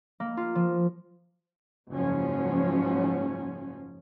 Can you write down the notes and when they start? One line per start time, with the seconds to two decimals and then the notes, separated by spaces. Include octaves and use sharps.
0.20 A#3
0.37 F4
0.55 F3
1.91 F#1 G#2 F3 F#3 C#4